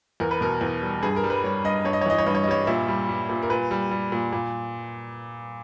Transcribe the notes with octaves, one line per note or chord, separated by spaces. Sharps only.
E2 A#4
B4
B2 A#4
E2
G3
G2 G#4
A#4
G3
B4
G3 C#5
G2 D#5
G2 C#5
D#5
C#5
E3 D#5
C#5
G2 D#5
C#5
D#5
G3 C#5
A#2 E5
G3
G3
A#2
A#4
A#2 B4
G3
G3
A#2
A#2